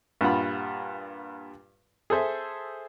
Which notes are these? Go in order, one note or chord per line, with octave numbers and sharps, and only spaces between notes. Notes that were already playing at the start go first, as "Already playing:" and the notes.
G2 A#2 F4 F#5 B5
G#4 A4 C5 E5